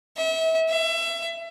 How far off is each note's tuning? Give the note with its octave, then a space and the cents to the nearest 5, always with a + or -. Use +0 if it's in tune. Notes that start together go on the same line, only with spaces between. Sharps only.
E5 -35
E5 +25